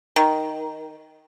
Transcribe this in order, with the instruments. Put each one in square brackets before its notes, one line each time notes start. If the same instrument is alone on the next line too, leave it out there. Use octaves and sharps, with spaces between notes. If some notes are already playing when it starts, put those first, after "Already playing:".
[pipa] D#3